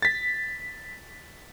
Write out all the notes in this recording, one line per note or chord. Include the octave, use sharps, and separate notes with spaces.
A6 B6